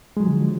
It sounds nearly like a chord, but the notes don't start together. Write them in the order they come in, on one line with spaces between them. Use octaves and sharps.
G#3 F#3 F3 D3